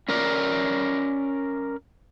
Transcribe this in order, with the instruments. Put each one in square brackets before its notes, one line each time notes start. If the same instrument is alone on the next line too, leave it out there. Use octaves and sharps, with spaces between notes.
[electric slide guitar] C#4 A#4 D5